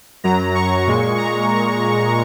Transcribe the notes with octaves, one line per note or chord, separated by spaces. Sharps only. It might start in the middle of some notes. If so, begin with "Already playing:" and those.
F#2 F#3 A#5
C#6
A#2 G#3
A#5